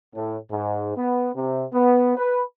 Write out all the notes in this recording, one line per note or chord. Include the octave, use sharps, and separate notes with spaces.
A2
G#2
B3
C3
B3
B4